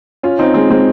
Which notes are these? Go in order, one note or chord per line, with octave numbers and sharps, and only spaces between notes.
C#4 F4
C4 D#4
G#3 C4
G#3 C4